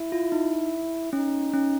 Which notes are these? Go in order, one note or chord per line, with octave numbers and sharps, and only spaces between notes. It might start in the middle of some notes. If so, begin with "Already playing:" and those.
Already playing: E4
F4
D#4
C#4 D#4
C#4